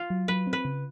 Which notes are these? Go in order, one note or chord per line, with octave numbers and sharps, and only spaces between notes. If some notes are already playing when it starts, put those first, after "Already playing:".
Already playing: F4
F#3
F#3 B4
C4
B4
C#3